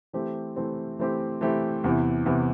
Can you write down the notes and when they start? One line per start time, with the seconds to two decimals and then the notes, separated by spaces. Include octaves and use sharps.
0.13 E3 A3 C4 G4
0.56 E3 A3 C4 G4
0.99 E3 A3 C4 G4
1.41 E3 A3 C4 G4
1.84 E2 C3 E3
2.26 E2 C3 E3